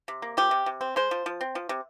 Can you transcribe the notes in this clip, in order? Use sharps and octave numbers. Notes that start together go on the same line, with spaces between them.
C3
A#3
F3 G4
C3
C3
C4
G#3 C5
F3
F3
C4
F3
C3